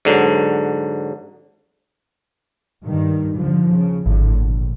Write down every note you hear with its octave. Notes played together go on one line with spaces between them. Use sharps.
G#2 D3 F#3
G2 D#3
D#2 D3 F3
C#3
G#1 A2 D3
A#1